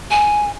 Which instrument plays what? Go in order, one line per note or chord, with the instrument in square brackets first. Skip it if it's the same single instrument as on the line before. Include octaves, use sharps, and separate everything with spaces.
[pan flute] G#5